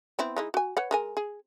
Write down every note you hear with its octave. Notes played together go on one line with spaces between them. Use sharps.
B3 C4 E4
G#3 D#4 E4
F#4 G#5
B4 C#5 F#5
G#3 A#4 G#5
G#4